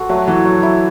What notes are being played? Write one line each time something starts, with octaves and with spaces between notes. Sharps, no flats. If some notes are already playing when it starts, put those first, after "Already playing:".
Already playing: F#4 A4 C5
F#3 A3
E3 F#3
F#3
E4